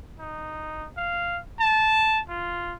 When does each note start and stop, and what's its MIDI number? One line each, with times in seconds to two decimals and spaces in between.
0.20 0.87 63
0.98 1.40 77
1.60 2.21 81
2.29 2.77 65